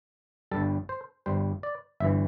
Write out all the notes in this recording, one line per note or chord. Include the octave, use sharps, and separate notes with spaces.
G1 G2 G3 A4
C5
G1 G2 G3 C5
D5
G1 G2 E3 E5